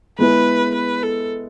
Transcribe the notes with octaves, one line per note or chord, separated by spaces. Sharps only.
G#3 B3 E4 G#4 B4
B4
A4